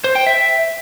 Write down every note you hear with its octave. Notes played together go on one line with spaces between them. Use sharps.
C5
G5
E5